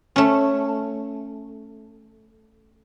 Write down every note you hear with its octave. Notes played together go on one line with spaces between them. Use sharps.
A3 C#4